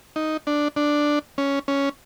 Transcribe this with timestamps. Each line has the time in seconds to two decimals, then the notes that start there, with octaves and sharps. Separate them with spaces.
0.16 D#4
0.47 D4
0.76 D4
1.38 C#4
1.68 C#4